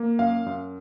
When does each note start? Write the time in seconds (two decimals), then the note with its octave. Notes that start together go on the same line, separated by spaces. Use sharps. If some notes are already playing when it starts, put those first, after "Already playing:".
Already playing: A#3
0.19 F#2 F5
0.46 F#2